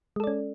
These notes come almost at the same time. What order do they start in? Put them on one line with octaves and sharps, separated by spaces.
G#3 A4 D5 C#4